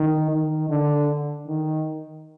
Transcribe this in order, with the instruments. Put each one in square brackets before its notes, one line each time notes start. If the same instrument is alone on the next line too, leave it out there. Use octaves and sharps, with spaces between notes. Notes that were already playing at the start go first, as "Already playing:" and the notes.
Already playing: [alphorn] D#3
D#3
D3
D#3